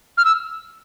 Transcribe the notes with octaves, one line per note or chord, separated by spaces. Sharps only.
F6
E6